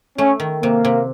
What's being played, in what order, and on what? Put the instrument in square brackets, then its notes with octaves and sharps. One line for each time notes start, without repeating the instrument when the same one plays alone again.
[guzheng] A3 [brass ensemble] C#4
[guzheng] D#3
[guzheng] C3 [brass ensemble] A#3
[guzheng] C3